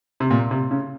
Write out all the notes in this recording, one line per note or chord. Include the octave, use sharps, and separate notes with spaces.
C3
A#2
C3
C#3